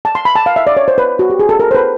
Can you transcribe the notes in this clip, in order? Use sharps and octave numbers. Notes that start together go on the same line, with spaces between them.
A5
C6
B5
A5
F5
E5
D5
C#5
C5
B4
F#4
G4
G#4
A4
A#4
C5
B4